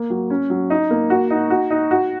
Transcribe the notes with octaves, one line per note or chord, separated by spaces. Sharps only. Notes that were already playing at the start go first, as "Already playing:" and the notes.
Already playing: A#3
F#3
C#4
F#3
D#4
A#3
F#4
D#4
F#4
D#4
F#4